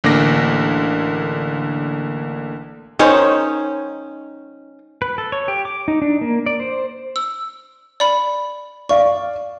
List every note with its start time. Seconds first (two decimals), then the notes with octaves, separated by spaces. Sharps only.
0.04 A1 D3 A#3 D6 A#6
2.99 D#3 G#3 C#4 D#4 C5 C#5
5.02 B4
5.18 A4
5.32 C#5
5.48 G4
5.65 D6
5.88 D#4
6.02 D4
6.21 A#3
6.46 D5
6.60 C5
7.16 E6
8.00 D5 B5
8.89 D5 F5 C#6